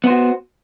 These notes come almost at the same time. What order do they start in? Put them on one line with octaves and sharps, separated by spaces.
B3 C5 F#4